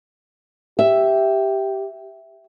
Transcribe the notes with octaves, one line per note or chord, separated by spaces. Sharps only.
G4 E5